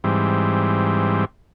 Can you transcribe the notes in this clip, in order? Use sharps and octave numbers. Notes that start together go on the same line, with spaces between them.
G#2 E3 G3 C4